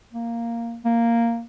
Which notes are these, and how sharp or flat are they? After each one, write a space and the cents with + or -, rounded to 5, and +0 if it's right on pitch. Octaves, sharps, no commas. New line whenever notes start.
A#3 -5
A#3 -5